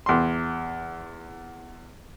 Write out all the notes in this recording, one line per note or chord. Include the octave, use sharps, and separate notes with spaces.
E2 C6